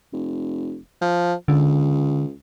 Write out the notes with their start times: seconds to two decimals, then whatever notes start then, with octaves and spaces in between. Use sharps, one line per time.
0.13 F1
1.01 F3
1.48 C#2 D3